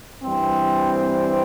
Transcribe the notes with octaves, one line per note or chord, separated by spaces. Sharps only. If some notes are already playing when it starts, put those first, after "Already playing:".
G2 E3 G3 C4